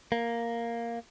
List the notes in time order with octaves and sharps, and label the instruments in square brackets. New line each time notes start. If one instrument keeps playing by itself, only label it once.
[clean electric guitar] A#3